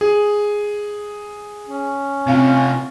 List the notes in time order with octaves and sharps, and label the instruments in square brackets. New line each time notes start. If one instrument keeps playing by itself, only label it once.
[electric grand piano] G#4
[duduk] C#4
[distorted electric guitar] C3 F4 [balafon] C4 F5 G#5